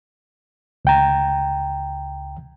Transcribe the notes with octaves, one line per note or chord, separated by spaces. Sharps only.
C#2 G5 A#5